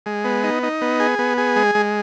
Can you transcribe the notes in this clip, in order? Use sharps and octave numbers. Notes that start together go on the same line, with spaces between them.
G#3
B3
D#4
D#4
B3
G#4
B3
G#4
G#3
G#3